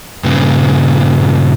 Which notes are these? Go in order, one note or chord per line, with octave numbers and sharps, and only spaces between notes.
G2 A#2 C#3